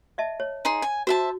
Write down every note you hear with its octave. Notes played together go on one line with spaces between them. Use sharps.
D#5 E5 A5
C#5
D#4 G#4 C6
G#5
F#4 C5 E5 A5